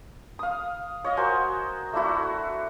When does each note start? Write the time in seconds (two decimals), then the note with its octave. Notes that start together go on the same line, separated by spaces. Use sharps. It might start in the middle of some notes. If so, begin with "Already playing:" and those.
0.39 F5 D#6
1.04 C#5 D#5 F5
1.17 F#4 A#4 C5 G#5
1.93 A3 D4 E4 F#4